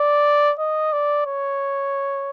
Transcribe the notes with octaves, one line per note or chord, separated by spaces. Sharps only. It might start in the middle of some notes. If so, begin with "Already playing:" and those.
Already playing: D5
D#5
D5
C#5